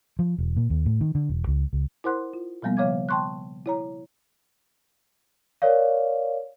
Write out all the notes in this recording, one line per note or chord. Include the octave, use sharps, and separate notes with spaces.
F3
E1
A#2
D#2
A2
D#3
D3
E1
C#2
C#2
E4 A#4 C5 F#5 C6 F#6
F4
B2 F3 G3 A#3 B3
C#3 F3 C#5 F5 D6 G#6
G5 A5 C6 C#6 F#6
E4 C#5 A#5
A#4 C#5 D5 F5